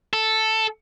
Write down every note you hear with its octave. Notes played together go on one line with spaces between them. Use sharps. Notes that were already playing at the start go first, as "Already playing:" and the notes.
A4